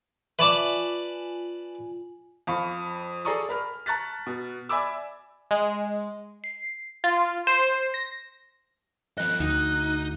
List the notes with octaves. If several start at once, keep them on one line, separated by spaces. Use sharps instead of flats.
F4 B4 D5 E5 G#5 A5 C#6 D6
F2 F5 B5 C#6
G#4 A4 D5 A#5 C#6 D#6
A#4 B5 F6
A5 A#5 C#6 F#6 A6 B6
B2
D5 E5 G#5 B5 D6 E6
G#3
C7
F4
C5
A#6
F3 D#5 F#6
D2 D#4